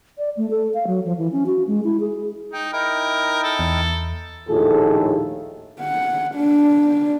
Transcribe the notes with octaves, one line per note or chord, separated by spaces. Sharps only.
D5
A3
A4
F5
F#3
F3
E3
C#4
F#4
G#3
E4
G#4
D#4 G5
D#4 E4 A#4 G5
A4
E2
A#1 D#2 A2 F4 G#4 A4
F#5
D4